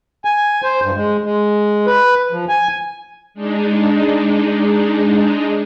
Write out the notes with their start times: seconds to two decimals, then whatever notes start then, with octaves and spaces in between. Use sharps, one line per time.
0.25 G#5
0.63 C5
0.82 G2
0.95 G#3
1.23 G#3
1.87 B4
2.32 F3
2.49 G#5
3.34 G#3 D4 D#4